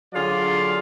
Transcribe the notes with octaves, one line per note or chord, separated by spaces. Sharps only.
D3 F#3 F4 G#4 D5 F5